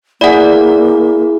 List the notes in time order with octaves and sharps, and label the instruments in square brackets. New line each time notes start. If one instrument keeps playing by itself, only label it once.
[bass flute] A#3 [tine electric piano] E4 G#4 [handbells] D5 F#5